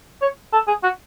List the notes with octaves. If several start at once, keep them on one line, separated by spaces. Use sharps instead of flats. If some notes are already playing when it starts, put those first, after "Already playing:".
C#5
A4
G#4
F#4